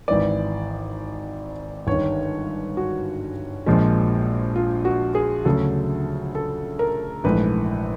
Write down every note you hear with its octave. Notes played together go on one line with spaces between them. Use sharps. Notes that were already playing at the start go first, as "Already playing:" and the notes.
G#1 G#2 E3 D5
G1 G2 D#3 C#5
F#4
A#1 A#2 F3 G#3
F4
F#4
G#4
D2 C#3 F#3 A4
A4
A#4
A#1 G#2 E3 A3 B4